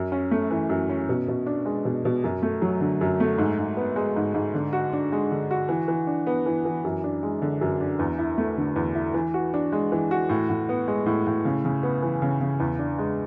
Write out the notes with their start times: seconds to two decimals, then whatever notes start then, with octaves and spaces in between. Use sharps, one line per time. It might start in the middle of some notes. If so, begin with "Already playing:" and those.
Already playing: F#2
0.12 C#4
0.31 A3
0.51 E3
0.70 F#2
0.90 C#4
1.09 B2
1.28 B2
1.47 D4
1.66 G#3
1.85 B2
2.05 B2
2.24 F#2
2.43 A3
2.62 F#3
2.81 D3
3.01 F#2
3.20 A3
3.38 G#2
3.59 G#2
3.77 B3
3.96 G#3
4.16 G#2
4.34 G#2
4.54 D3
4.73 F#4
4.93 D4
5.12 G#3
5.31 D3
5.51 F#4
5.69 E3
5.88 E3
6.07 D4
6.27 B3
6.46 E3
6.65 E3
6.85 F#2
7.04 D4
7.23 G#3
7.42 D3
7.61 F#2
7.81 D4
7.99 E2
8.18 E4
8.38 A3
8.57 D3
8.76 E2
8.95 E4
9.14 E3
9.34 F#4
9.54 D4
9.72 G#3
9.92 E3
10.11 F#4
10.29 A2
10.50 A2
10.69 B3
10.88 G#3
11.06 A2
11.27 A2
11.45 C#3
11.65 C#3
11.83 B3
12.03 E3
12.22 C#3
12.41 C#3
12.60 E2
12.79 D4
12.99 G#3